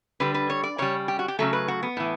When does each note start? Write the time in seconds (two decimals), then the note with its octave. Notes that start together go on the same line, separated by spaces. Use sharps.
0.20 D3 G3 B4
0.34 B4
0.50 C#5
0.64 D5
0.78 C#3 G3 C#5
1.08 G4
1.19 F#4
1.28 G4
1.39 C#3 F#3 A3 A4
1.53 B4
1.68 F#4
1.83 B3
1.97 A2 E3